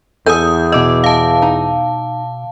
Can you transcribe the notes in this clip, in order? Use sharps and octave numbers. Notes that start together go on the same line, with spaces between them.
E2 A4 G#5 D#6 G6
B2 D#5 D6 E6
F5 A5
D#4